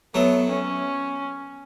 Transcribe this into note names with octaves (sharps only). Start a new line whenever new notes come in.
F#3 A3 B3
C#4